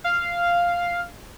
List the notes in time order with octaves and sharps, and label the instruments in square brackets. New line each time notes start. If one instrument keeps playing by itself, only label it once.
[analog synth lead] F5